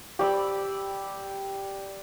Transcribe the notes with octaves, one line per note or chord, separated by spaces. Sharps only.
G4 D5 B5 E6